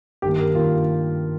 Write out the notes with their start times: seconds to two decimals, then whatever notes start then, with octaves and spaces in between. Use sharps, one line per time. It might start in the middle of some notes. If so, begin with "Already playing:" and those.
0.22 G2 D#3 A#3 G4
0.39 A#4
0.55 G2 D#3 A#3 F4